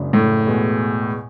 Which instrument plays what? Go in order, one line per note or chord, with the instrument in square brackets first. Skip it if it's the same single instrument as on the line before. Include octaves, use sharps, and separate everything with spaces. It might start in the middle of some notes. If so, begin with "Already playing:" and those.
Already playing: [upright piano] F#1 F#2 C#3 G#3 D4
[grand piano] A2
[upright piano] E2 B2 G#3 B3